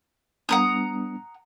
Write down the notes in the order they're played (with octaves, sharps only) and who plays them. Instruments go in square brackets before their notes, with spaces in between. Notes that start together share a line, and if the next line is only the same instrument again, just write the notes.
[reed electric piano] G3 B3 D4 [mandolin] F#5 A#5 D#6